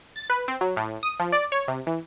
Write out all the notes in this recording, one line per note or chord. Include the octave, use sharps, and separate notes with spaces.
A6
B4
C4
F#3
A2
D#6
F3
D5
C#5
C3
E3